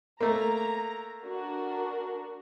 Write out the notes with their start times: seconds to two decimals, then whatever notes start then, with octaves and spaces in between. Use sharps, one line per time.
0.21 A3 A#3 A#5
1.22 D4 F#4 A#4